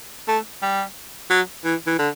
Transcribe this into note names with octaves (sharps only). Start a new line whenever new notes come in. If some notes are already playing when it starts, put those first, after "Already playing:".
A3
G3
F#3
E3
E3
D3